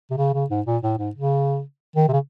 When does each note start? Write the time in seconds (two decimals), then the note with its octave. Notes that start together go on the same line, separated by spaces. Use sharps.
0.10 C3
0.17 C#3
0.33 C#3
0.50 G#2
0.66 A#2
0.83 A2
0.98 G#2
1.15 C#3
1.96 D#3
2.08 C3
2.13 C#3